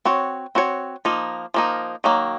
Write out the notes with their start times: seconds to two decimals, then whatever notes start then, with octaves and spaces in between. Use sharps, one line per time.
0.05 C4 F#4 C#5
0.55 C4 F#4 C#5
1.05 F3 A#3 D#4
1.54 F3 A#3 D#4
2.04 D#3 F#3 A#3